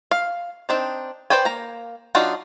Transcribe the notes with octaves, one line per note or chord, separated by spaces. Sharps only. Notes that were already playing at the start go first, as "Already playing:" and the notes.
F5
C4 D4 D#4
B4 C5 D5 G5 G#5
A#3 A#5
F#3 D4 D#4 F4 F#4